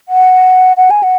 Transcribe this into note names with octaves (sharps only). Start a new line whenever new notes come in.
F#5
F#5
G#5
F#5